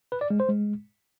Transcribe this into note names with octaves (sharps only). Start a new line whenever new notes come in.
B4
D5
G#3
C5
G#3